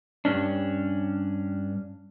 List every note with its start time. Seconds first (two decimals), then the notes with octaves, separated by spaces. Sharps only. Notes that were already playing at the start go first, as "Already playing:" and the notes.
0.25 G2 C#4 D4